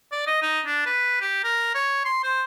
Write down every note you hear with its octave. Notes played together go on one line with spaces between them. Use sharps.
D5
D#5
D#4
D4
B4
G4
A#4
C#5
C6
C5